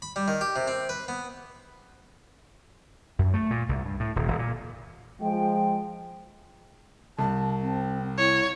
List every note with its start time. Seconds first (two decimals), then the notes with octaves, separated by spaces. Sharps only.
0.02 B5
0.16 G3
0.28 D#3
0.41 G4
0.56 C3
0.68 C4
0.89 B4
1.08 B3
3.19 F#2
3.34 A3
3.51 A#2
3.69 C2
3.85 G2
4.00 A2
4.16 D#1
4.28 D#1
4.39 A#2
5.21 F3 G#3 G5
7.19 C2 A5
7.62 C4
8.18 E4 C#5